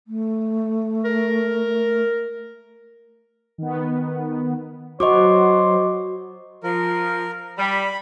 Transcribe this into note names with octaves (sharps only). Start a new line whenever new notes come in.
A3
A#4
D#3 B3
F#3 F#4 C5 D#5 C#6 D6
F3 A#4
G3 B5